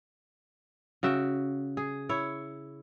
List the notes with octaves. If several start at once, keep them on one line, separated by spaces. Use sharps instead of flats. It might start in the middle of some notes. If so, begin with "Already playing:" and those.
C#3 F#4 E5 G5
G#4
E4 C#5